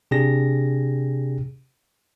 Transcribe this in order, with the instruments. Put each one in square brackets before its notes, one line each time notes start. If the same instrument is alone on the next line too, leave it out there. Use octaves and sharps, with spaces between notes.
[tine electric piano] C3 D4 G4 G#4 A#6